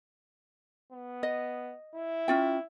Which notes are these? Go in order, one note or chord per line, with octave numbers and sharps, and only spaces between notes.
B3
D#5
E4
C#4 F4 G5